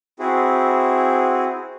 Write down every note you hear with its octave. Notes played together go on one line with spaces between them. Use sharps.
C4 E4 F#4 G#4